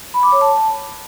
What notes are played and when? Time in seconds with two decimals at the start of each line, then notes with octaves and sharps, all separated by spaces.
0.14 B5
0.23 D6
0.32 C#5
0.41 A5